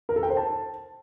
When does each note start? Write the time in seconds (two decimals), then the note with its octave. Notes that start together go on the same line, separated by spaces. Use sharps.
0.09 A#4
0.16 A4
0.23 G5
0.30 C5
0.37 A5